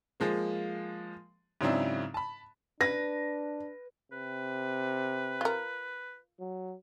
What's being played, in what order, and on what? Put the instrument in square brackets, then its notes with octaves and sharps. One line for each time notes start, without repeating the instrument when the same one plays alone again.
[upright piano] F3 G#3 A#3
G#2 C#3 F#3 C4 D4 E4
A5 B5
[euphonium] D4 [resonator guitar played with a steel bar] B4 [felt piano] A#6
[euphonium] C3 [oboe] B4
[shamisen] F4 A#4
[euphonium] F#3